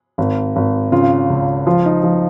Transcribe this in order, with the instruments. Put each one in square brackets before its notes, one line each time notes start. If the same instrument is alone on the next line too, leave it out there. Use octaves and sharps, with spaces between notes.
[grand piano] G#1
G#1
C#3 F4
C#2
F3 F4
D#4
F3